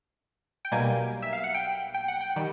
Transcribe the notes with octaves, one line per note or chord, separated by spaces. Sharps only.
G5
B1 B2 G3 A#3 G#5
E5
F5
F#5
G5
G5
F#5
G5
D#3 G3